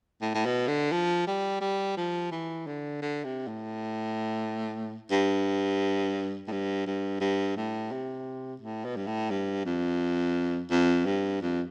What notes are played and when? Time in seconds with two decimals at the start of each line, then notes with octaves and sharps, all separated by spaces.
0.22 A2
0.35 A2
0.45 B2
0.68 D3
0.92 F3
1.27 G3
1.61 G3
1.97 F3
2.32 E3
2.66 D3
3.02 D3
3.24 C3
3.48 A2
5.11 G2
6.48 A2
6.52 G2
6.87 G2
7.21 G2
7.57 A2
7.92 C3
8.61 A2
8.85 B2
8.96 G2
9.07 A2
9.30 G2
9.66 F2
10.71 F2
11.05 G2
11.41 F2